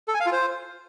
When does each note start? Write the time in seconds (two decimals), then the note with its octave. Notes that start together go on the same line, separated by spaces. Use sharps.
0.08 A4
0.14 G#5
0.20 F5
0.26 F4
0.32 C5